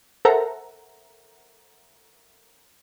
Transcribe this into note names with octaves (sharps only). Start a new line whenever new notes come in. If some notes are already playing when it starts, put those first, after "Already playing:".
A4 A#4 C5 E5 F#5 A#5